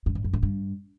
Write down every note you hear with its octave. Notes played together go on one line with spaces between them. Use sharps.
G2
G#2
F#2
A2
G2